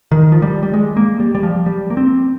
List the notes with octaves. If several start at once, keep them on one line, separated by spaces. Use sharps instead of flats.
D#3
F3
G3
G3
G#3
A#3
G3
G3
F3
G3
A#3
C4